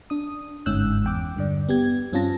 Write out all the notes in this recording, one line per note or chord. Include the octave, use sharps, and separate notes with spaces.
D4 D#6
G1 G#2 C#4 E6 F#6 G6
E2 G5 D6
G2 D3 D5
B3 G4 G#6
G2 C4 C#4 F4 A5 A#6